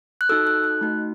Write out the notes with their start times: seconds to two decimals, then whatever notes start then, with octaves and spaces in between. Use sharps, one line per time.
0.21 F#6
0.29 D#4 F#4 A4 E6
0.47 F#6
0.64 F#6
0.81 A3 D#4 F#4